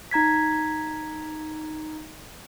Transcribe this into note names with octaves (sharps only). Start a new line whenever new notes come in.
D#4 A#5 G#6 B6